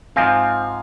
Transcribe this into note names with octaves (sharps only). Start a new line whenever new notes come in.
G#2 F3 C4 F5 G#5